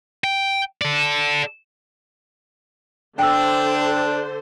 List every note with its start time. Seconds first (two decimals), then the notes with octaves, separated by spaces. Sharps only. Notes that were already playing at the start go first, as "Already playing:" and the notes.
0.24 G5
0.82 A4 D5
3.19 D3 D4 C5 G5 E6